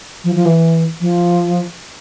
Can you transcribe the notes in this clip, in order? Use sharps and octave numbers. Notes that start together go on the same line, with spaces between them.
F3
F3
E3
F3